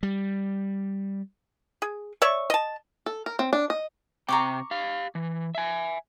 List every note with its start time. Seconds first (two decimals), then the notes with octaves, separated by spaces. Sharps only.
0.03 G3
1.82 G#4
2.22 C#5 D5 E5 C#6
2.50 D#5 A5
3.06 A4
3.26 A#4
3.39 C4
3.53 D4
3.70 D#5
4.28 C3 C4 G5 A#5 C#6 D6
4.71 G4 F5
5.15 E3
5.55 E5 G#5